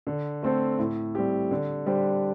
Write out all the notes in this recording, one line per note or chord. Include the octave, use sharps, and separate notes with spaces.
D3
A3 C4 A4 C5
A2
G3 C4 G4
D3
G3 D4 G4 C5